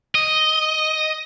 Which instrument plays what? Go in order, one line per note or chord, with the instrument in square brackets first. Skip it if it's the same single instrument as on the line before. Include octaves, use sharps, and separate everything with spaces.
[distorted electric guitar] D#5